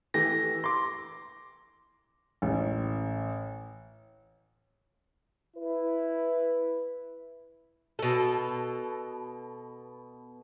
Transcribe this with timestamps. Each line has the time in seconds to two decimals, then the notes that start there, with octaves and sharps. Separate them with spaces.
0.14 E3 A3 G4 A#6
0.64 C6 D6
2.42 A1
5.57 E4 B4
7.99 B2 A4